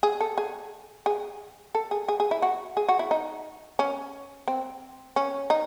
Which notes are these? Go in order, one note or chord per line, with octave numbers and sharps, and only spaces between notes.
G#4
A4
G#4
G#4
A4
G#4
G#4
G#4
E4
F#4
G#4
F#4
E4
D#4
C#4
C4
C#4
D#4